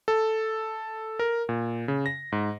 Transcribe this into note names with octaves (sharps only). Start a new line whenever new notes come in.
A4
A#4
A#2
C#3
A#6
G#2